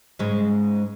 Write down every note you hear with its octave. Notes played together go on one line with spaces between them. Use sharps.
G#2 C#3 G#3